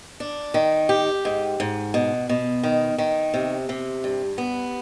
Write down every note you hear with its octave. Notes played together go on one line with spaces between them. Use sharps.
D4
D#3
G4
G#2
G#2
B2
B2
D#3
D#3
C3
C3
G2
B3